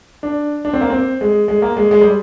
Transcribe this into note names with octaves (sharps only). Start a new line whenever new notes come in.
D4
D4
C4
A#3
C4
G#3
G#3
A#3
G#3
G#3
G3